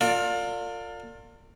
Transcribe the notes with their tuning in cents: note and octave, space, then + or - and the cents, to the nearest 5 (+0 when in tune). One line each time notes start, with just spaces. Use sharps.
F4 +25 A#4 -45 D5 +0